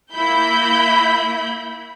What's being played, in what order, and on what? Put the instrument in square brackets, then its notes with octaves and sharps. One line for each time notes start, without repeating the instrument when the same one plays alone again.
[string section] A#3 E4 B5 G6